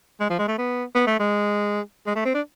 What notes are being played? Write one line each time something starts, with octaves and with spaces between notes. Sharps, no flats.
G#3
F3
G#3
A3
B3
B3
A3
G#3
G#3
A3
C4
D4